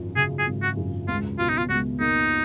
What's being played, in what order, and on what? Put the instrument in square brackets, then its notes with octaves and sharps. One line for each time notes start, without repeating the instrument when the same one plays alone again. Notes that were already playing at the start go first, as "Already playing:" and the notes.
Already playing: [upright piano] G#1 F#2 F3
[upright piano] C#3 [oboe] G#4
[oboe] G#4
[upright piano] G#1
[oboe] F#4
[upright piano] F#2
[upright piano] C#2 [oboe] F4
[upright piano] B2 [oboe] F4
[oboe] D#4
F4
[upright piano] C#2 [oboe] F#4
[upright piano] A#3 [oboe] D#4